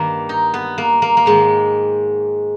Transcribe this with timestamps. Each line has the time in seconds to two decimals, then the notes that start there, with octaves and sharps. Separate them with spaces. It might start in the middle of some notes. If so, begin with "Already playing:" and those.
Already playing: G2 D#3 A#3
0.29 D#4
0.54 B3
0.78 A#3
1.02 A#3
1.17 A#3
1.26 G#2 D#3 G#3